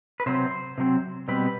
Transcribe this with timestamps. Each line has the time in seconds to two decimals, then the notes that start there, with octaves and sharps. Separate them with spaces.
0.20 B4
0.26 C3 F#3 C4 C5
0.78 C3 F#3 C4
1.28 B2 G3 C4 B4